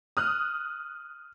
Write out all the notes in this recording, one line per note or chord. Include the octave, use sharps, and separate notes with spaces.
D#6 F6 F#6